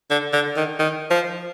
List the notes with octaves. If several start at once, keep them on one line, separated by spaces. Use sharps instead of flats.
D3
D3
D#3
D#3
F3